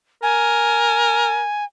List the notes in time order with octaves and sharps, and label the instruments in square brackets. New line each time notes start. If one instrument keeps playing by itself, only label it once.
[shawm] A#4 [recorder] G#5